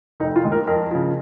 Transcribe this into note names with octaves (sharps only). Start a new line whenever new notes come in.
F1 D#4
F4
D#2 D#3 G#3
A#4
F2 A#4
C#3 F3